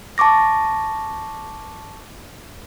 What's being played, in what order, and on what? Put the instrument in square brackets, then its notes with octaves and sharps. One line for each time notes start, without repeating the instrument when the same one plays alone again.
[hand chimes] A5 C#6 D6 A#6